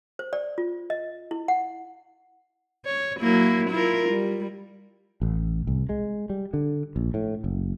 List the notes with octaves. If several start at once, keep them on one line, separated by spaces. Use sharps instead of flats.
C5
D5
F4
D#5
E4
F#5
C#5
F#3 A#3 E4
E4 F4 A#4
G3
A1
C2
G#3
G3
D3
A#1
A2
F#1